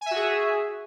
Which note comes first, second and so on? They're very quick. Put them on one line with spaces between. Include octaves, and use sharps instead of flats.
G#5 E5 F#4 G#4